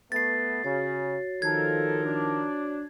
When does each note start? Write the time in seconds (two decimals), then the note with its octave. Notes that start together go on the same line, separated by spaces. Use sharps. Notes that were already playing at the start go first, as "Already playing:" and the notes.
0.12 A3 B3 A6 C7
0.64 C#3 F#4 C#5
1.42 D#3 F3 A4 A#4 G#6
2.04 D4